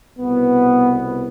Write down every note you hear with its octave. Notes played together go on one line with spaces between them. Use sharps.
C2 B2 B3